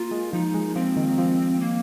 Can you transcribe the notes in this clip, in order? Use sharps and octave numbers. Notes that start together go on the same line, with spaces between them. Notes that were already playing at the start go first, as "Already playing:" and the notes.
Already playing: A#3 F4
G#3
F3 D#4
G#3
F3 C4
D#3
F3
F3
A#3